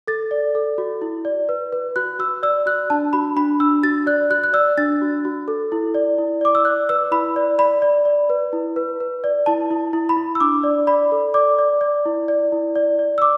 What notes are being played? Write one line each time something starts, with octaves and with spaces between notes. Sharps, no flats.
A4 A6
D5
A4
F#4
E4
D5
B4
B4
F#4 F#6
F#4 E6
D5 E6
F#4 F#6
D4 A5
F#4 B5
D4 B5
D4 E6
F#4 A6
D5 F#6
F#4 F#6
F#6
D5 E6
D4 A6
F#4
F#4
A4
E4
D5
E4
D5 D6
E6
D5 F#6
B4 E6
E4 B5
D5
D5 B5
D5
D5
B4
E4
B4
B4
D5
E4 A5
E4
E4
B5
E4
E6
D4 D6
D5
D5 B5
A4
D5 D6
D5
D5
E4
D5
E4
D5
D5
E6
D6